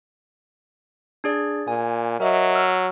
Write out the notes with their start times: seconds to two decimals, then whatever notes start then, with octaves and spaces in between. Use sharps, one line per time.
1.24 D4 G#4 D5
1.68 A#2 G#5
2.20 F#3 A#4 D#5 E5
2.55 E6 F6